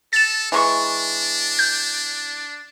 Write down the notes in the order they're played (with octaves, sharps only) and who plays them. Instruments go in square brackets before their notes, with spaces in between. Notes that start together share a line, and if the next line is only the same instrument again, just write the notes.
[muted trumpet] A4 [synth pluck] A6 E7
[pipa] E3 G#3 C#6 [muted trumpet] D4
[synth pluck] G6